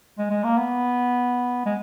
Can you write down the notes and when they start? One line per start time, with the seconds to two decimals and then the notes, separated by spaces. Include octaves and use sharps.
0.18 G#3
0.31 G#3
0.44 A#3
0.58 B3
1.66 G#3